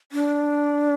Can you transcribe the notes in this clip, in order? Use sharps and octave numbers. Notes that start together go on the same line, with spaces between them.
D4